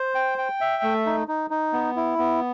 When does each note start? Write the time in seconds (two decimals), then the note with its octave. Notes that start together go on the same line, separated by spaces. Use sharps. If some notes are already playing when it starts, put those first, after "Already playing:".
Already playing: C5
0.15 G5
0.38 G5
0.61 E5
0.83 A3
1.06 D#4
1.28 D#4
1.50 D#4
1.73 B3
1.96 E4
2.19 B3